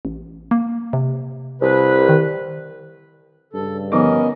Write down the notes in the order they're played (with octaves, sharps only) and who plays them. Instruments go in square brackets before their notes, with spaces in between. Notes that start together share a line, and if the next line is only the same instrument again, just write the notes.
[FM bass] A1
A#3
C3
[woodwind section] C2 B4
[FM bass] D#3
[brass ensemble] G2 C#3 [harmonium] A4
[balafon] D3 F3 D#4 [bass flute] B3 [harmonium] C#4 A#4 D#5